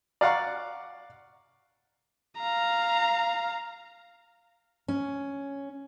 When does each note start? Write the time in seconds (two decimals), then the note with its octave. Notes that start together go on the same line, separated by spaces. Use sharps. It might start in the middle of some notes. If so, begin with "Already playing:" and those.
0.21 D5 F5 F#5 A#5 C#6
2.39 F5 A#5
4.88 C#4